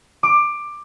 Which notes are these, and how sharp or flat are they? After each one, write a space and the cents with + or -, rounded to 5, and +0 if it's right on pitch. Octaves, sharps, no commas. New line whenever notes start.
D6 +15